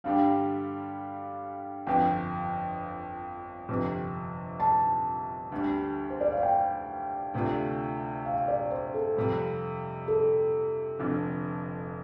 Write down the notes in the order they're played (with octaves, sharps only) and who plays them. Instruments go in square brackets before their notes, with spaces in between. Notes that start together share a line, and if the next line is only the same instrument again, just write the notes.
[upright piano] G2 D3 G3 D4 G4 [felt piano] F5
[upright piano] G1 F2 F3 [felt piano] G5
[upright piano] G1 F2 C3
[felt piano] A5
[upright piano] D2 D3 G3
[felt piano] C5
D5
F5
G5
[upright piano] D2 C3 A3 D4 F4
[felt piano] F5
D5
C5
A4
[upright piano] F2 C3 G3
[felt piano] A4
[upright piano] F1 F2 D3